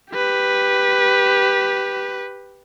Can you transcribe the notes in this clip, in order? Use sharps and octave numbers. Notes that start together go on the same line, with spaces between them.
G4 B4